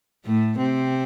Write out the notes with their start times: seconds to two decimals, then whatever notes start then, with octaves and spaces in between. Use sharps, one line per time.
0.25 A2 A3
0.58 C3 C4